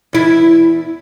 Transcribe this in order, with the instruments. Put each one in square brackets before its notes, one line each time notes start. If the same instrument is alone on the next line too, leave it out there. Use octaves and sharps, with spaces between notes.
[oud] E2 E4